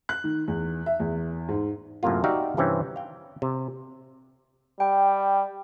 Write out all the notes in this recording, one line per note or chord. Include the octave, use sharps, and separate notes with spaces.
F#6
D#3
E2
E5
E2
G#2
F#2 A2 C3 A#3 F4
D#4 F#4 G4 D5 E5 F5
G2 C3 E3 C4 C#4
F5 G5
C3
G3 G5